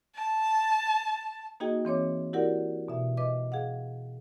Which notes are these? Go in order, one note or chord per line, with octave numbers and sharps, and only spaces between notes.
A5
A#3 D#4 F#4 G#4 D#5 G5
E3 C4 C#5 D6
E4 F#4 G4 A#4 D5 F#5
B2 E5
B4 D#5 D6
G#4 F5 F#5